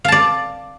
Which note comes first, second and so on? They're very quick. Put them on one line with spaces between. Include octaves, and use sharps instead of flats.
F5 A5 D5